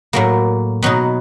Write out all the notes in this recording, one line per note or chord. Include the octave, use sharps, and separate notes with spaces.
A2 F#3 A#3
B2 F#3 B3 D#4